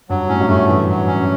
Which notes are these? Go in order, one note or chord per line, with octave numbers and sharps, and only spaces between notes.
G2 F#3
A2 C#4
F#2
G2 A3
E3 F#3
F#3
C#4